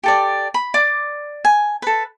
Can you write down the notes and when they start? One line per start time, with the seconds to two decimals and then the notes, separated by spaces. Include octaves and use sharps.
0.04 G4 A4 D5
0.54 B5
0.74 D5 D6
1.45 G#5
1.82 A4 B4